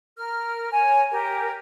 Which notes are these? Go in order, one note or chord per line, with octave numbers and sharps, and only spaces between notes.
A#4 F6
C#5 G#5
G4 A#4